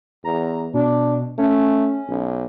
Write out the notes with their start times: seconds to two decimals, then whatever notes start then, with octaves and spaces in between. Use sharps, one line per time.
0.24 E2 A#5
0.74 B2 D4
1.38 A3 C#4
2.09 B1